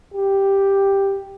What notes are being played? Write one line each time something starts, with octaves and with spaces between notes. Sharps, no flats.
G4